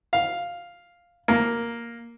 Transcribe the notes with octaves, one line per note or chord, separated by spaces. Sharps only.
F5
A#3